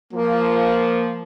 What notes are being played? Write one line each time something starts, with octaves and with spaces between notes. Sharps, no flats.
F3 A#3